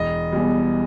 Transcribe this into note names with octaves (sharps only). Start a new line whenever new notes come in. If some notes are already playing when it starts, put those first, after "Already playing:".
Already playing: E1 D#5
E2 B2 G3